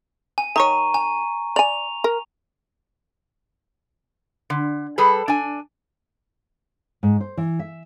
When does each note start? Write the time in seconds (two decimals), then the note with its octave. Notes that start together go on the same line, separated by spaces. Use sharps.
0.38 G#5
0.56 D#3 C#5 A#5 C#6 D#7
0.94 G#5
1.56 D5 G#5 F7
2.04 A#4
4.50 D3
4.98 G3 G#4 A4 B4
5.28 D4 G#5
7.03 G#2
7.20 C5
7.37 E3
7.59 E5